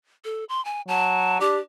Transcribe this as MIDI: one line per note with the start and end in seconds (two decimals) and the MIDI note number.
0.25 0.44 69
0.49 0.63 84
0.65 0.81 80
0.88 1.39 54
0.88 1.40 81
1.40 1.57 62
1.40 1.59 67